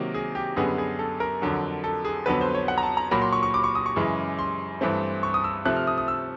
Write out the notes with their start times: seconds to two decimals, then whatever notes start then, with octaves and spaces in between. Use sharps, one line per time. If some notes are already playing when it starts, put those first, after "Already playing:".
Already playing: C3 D#3 F#3 A#3
0.14 G#4
0.35 G4
0.56 F#2 D3 G3 B3 G#4
0.78 G#4
0.99 A4
1.20 A#4
1.42 F2 D3 F#3
1.84 A4
2.05 G#4
2.26 F2 D3 F#3 B3 B4
2.41 C5
2.55 C#5
2.68 F#5
2.78 A#5
2.83 A5
2.97 A#5
3.11 A#2 F#3 A#3 B5
3.22 C6
3.33 C#6
3.43 C#6
3.54 D6
3.64 C#6
3.75 D#6
3.86 C#6
3.96 F#2 C#3 E3 G#3
4.38 C6
4.81 G2 E3 A3 C4
5.23 C#6
5.34 D#6
5.44 E6
5.65 C3 F3 A3 F#6
5.76 F6
5.87 D#6
5.98 D#6
6.08 E6